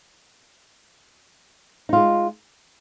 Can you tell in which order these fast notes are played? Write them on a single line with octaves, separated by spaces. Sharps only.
D#4 F4 G#3